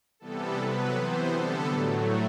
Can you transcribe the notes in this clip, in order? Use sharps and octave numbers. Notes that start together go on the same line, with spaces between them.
C3 E3 G3 B3 A4
C3 F#3 B3 B4
C3 E3 B3 C5
D3 G3 B3 A4
A2 F#3 A3